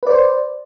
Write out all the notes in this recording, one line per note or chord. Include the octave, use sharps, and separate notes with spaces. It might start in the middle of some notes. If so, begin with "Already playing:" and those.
B4 C5 D5